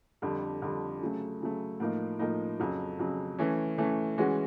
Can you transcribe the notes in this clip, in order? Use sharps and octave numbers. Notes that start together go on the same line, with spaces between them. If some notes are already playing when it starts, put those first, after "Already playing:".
F2 D3 G3
F2 D3 G3
C#3 F#3 A3
C#3 F#3 A3
A2 F3 A#3 D#4
A2 F3 A#3 D#4
F2 C#3 F#3
F2 C#3 F#3
E3 A3 C#4
E3 A3 C#4
E3 G#3 C#4 F#4